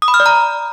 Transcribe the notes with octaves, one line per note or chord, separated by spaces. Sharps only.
D#6
B5
F6
D5
A#5